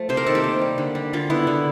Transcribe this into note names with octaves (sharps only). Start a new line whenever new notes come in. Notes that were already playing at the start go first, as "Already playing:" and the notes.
Already playing: F3 A3
C3 C5
A#4
D#3 A4
G4
A#3
G3
D3
G3
D3 F4
B3 E4
D3